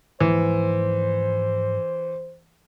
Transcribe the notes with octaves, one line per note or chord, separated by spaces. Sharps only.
G#2 E3 F3 A#3 C5